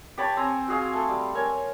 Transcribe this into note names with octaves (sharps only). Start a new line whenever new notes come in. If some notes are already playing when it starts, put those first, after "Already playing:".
G4 C#5 A5 B5
C4 G#5 A#5
F#4 G#4 F5
A3
G3
A#4 C#5 G#5